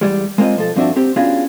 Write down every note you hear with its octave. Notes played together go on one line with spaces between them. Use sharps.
E2 G2 G3 G#3
G#3 A#3 C4 F4 D#5
B1 F3 A4
G2 F3 C4 D4 F#4 E5
C4 G4
B3 C#4 D4 F4 F#4 G#4